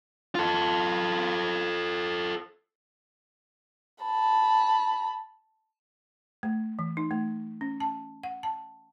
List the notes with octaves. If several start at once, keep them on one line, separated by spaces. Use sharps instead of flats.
F4 A4
A5 B5
A3
E3
D#4
A3
C#4
A5
F#5
A5